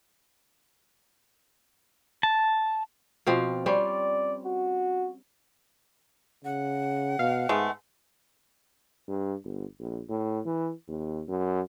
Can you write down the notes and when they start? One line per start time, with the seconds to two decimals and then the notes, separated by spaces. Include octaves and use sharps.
2.23 A5
3.26 B2 F3 C4
3.66 G3 C4 C#4 D5
4.45 F#4
6.45 C#3 F#5
7.19 B2 F5
7.49 G#2 G#3 A3 B3
9.08 G2
9.44 G1
9.79 A#1
10.09 A2
10.46 E3
10.88 D#2
11.29 F#2